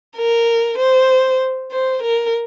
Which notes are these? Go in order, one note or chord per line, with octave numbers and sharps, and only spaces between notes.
A#4
C5
C5
A#4